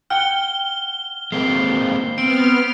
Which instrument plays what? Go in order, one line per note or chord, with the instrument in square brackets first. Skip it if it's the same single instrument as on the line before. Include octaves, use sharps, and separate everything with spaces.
[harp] F#5 G5 [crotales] F6 G7
[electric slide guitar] G#3 A#3 C4 [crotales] C7
[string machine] B3 F6 [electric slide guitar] C4 [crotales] D7